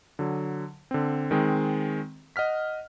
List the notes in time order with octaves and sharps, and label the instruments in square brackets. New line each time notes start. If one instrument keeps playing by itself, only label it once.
[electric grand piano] D3 F#3
D3 C4
D#3 G#3 C4
D#5 F#5 F6 B6